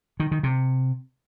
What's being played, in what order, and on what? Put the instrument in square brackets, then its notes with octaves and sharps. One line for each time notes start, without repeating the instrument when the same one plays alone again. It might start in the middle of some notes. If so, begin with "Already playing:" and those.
[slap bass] D#3
D#3
C3